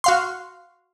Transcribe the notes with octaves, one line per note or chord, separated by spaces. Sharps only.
F#4 F5 C6